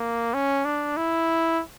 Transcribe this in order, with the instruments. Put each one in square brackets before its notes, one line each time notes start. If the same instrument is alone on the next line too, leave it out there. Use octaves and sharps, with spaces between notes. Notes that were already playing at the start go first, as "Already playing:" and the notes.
Already playing: [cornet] A#3
C#4
D4
E4